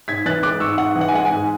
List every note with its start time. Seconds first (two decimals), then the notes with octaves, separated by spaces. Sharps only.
0.08 G#2 G#6 B6
0.26 E3 F#6 A6
0.43 G#3 D6 F#6
0.60 G#2 C#6 E6
0.78 G#2 F#5
0.96 E3
1.01 F#5
1.08 G#5
1.13 G#3 F#5
1.25 G#5
1.31 G#2